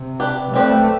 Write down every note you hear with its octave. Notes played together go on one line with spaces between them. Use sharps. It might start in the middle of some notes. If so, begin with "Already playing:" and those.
Already playing: C3
D4 G4 B4
G3 A3 C4 G4 B4 D5